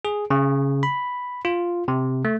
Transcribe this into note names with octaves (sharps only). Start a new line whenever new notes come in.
G#4
C#3
B5
F4
C3
A3